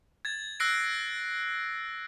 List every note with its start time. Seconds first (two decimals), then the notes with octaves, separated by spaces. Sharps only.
0.25 G#6 A6
0.60 E6 F#6 A#6 C7 D7